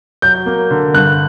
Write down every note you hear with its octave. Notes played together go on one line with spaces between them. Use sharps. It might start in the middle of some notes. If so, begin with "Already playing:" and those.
F#3 G6
A#3
D3
G2 F#6